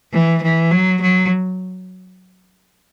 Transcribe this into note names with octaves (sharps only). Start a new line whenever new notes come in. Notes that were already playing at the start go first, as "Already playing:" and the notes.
E3
E3
F#3
F#3